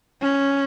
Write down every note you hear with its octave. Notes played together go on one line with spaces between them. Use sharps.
C#4